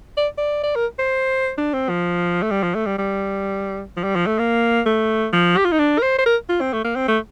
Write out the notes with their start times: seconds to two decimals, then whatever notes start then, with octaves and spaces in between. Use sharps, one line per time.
0.17 D5
0.38 D5
0.64 D5
0.76 A#4
0.99 C5
1.58 D4
1.74 C4
1.89 F3
2.43 A3
2.51 G3
2.63 F3
2.75 A3
2.86 G3
2.98 G3
3.97 F3
4.04 G3
4.16 F3
4.27 A3
4.39 A#3
4.86 A3
5.33 F3
5.57 G4
5.65 F4
5.72 D#4
5.79 D4
5.99 A#4
6.02 C5
6.19 C5
6.26 A#4
6.49 F4
6.61 C4
6.73 A3
6.85 A#3
6.96 C4
7.08 A3